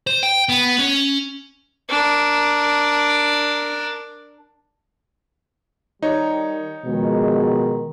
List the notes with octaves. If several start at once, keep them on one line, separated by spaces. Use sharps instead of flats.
C5
G5
B3
C#4
D4 A#4
D#3 G3 D#4 C#5
B2 D#3 F3 G#3